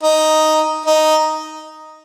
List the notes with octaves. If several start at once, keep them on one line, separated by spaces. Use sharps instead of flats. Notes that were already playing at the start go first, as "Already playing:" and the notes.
D#4
D#4